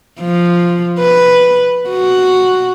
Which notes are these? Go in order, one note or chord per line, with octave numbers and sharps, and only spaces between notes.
F3
B4
F#4